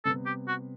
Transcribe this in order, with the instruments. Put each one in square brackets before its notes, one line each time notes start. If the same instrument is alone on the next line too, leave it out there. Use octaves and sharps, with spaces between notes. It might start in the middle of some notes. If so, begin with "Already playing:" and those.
[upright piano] C3 G3 B3 [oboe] A4
[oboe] G4
F#4